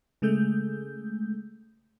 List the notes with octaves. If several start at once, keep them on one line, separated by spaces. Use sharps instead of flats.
C#3 G#3 A3 G6